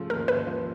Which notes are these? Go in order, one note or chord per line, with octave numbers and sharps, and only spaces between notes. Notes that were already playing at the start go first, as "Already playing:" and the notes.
Already playing: C#3 F3 A3
D#2 A#4
D#2 B4
F3